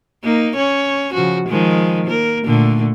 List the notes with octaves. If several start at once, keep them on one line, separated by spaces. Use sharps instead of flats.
A#3 D#4
C#4 C#5
C#3 F3 F#4
D#3 F3 G#3
A#3 A#4
A#2 D3 A3